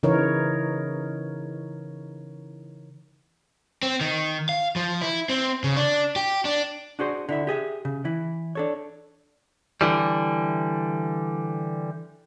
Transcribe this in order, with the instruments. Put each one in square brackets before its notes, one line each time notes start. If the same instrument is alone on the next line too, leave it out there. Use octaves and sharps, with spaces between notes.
[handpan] C#3 E3 D#4 E4 A#4 C#5
[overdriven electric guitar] C4
D#3
F5
F3
E4
C4
C#3
D4
G4
D4
[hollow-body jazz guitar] D4 F#4 G#4 C5
D3 E4 E5
G4 G#4 D#5 E5
C#3
E3 E4
D4 A4 C#5
[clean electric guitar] D3 E3 G3